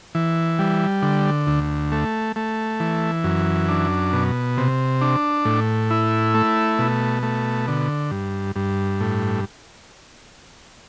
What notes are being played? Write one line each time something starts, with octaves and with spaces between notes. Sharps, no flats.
E3
G3
D3
D2
A3
A3
E3
F#2
D4
B2
C3
D4
A2
E4
A3
B2
A3
D3
G2
G2
A2